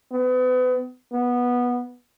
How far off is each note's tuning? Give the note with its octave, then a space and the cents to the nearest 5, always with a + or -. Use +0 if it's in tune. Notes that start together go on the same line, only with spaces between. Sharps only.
B3 +35
B3 -10